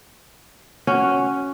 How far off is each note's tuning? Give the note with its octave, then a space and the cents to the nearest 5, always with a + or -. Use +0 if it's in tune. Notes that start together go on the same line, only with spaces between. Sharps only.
C#4 +0 F#4 +0